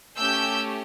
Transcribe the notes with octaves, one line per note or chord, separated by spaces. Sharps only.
A3 C#4 G4 E6 G6